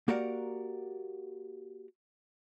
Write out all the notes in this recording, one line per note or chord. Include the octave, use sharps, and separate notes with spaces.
A#3 F#4 G4 A#4 D5 F#5